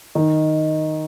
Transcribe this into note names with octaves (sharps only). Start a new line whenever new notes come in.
D#3